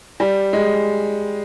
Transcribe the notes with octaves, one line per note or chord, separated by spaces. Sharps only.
G3
G#3